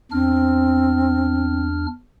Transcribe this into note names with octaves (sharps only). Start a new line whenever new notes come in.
E2 C4 D4 F6